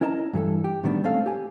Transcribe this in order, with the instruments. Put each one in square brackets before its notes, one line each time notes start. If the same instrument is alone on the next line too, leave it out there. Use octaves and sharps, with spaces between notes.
[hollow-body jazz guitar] C#4 E4 A#4 D#5 A5 A#5
G2 E3 G#4 A4
G4
A2 D#3 F#3 G3 B3 D4
G#3 A3 C4 C#4 A4 F5
G4 G#5